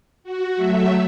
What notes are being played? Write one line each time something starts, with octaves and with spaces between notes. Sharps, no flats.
F#4
F#3 A3 E5